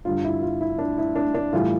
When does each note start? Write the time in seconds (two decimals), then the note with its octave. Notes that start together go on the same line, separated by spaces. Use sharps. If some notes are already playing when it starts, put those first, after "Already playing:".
0.05 G2 D3 G3 F4
0.24 E4
0.42 F4
0.61 E4
0.79 D4
0.98 E4
1.16 D4
1.34 D4
1.53 A2 E3 G3 F4